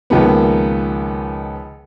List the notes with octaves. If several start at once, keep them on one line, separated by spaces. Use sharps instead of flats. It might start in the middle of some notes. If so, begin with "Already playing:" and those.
C#2 D#3 F3 A#3 B3